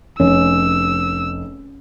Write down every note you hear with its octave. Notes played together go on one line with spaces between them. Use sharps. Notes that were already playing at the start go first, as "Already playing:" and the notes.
F1 C#4 E6